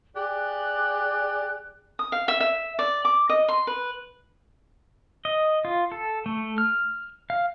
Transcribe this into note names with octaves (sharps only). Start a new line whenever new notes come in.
G4 G#4 D5 F#6
D#6
F5
E5
E5
D5
D6
D#5
C6
B4
D#5
F4
A4
A3
F6
F5